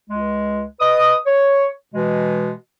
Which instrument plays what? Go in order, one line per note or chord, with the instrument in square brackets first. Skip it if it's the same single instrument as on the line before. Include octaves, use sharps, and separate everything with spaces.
[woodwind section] C#2 G#3
B4 D#5 D#6
C#5
B2 E3 G#3